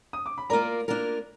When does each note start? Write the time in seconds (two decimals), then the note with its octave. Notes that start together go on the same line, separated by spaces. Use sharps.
0.13 D#6
0.26 D6
0.38 B5
0.50 A#3 F4 A#4 D5 A#5
0.88 A#3 D4 F4 A#4